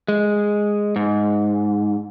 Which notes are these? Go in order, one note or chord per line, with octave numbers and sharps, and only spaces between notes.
G#3
G#2